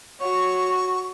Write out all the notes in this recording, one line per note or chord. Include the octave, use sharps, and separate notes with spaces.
F#4 C#5 C#6